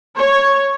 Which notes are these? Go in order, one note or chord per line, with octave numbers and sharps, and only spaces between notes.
C#5